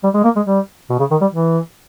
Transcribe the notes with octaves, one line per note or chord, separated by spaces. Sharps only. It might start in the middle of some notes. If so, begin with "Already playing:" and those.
G3
G#3
A#3
G#3
G3
B2
C#3
D#3
G3
E3